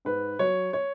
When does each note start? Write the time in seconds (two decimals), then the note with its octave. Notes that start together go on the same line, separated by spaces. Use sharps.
0.05 G#2 B4
0.39 F#3 C#5
0.73 C#5